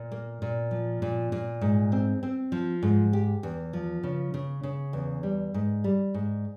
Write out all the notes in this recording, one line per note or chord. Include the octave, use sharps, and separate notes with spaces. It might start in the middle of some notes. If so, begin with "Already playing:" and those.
Already playing: A#2
A#3
A#2
F3
A#2
A#2
G#2
C4
C4
F3
G#2
G4
E2
F3
C#3
C#3
C#3
E2
G3
G#2
G3
G#2